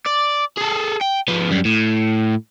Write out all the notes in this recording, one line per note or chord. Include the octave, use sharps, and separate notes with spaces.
D5
G#4 A4
G5
F3 B3
F#2 G3
A2